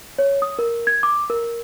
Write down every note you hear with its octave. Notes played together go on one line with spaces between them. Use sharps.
C#5
D#6
A#4
G#6
D6
A#4